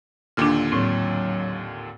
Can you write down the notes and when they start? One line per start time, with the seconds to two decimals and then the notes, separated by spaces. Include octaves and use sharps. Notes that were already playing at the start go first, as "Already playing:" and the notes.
0.37 D#2 A#2 D3 D4 F6
0.72 A2 F#3 C4